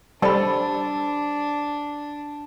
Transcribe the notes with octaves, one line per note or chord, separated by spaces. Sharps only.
G3 D4 A4 C5 D5 A5 B5